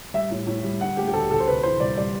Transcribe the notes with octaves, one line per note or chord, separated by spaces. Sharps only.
G3 E5
A2
A2
G3
D3 F#5
A3 G4
G4
D2 A4
D2 A4
C5
C3 B4
E3 C5
C2 D5
G3 D5